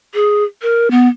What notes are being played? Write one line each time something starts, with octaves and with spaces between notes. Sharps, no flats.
G#4
A#4
B3